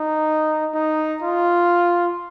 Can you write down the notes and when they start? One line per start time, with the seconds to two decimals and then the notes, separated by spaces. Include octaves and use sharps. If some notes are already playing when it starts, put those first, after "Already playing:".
Already playing: D#4
0.75 D#4
1.22 F4